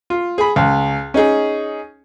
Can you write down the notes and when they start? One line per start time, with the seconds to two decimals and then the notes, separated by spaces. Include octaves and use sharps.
0.10 F4
0.38 G#4 B5
0.56 C#2
1.14 C#4 D#4 G#4